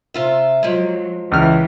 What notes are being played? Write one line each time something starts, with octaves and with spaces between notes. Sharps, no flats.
C3 F4 E5
F3 F#3 G#3
C#2 E3 F6